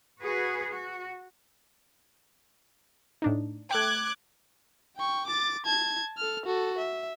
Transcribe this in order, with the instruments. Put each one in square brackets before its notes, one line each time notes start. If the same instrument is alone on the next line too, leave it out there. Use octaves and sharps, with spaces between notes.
[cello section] F#4 G#4 B4
F#4
[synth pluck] A2 D4 D#4
[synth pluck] A3 G5 [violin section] D6 F#6 G#6
[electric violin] G5 C#6
D6 A6
A5 G#6
A4 F6
F#4 A4
E5